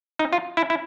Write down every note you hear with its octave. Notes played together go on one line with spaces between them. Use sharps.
D#4
F4
E4
E4